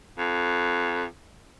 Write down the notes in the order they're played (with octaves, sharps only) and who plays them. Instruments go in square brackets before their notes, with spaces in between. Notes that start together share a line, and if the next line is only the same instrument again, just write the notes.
[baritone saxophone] F2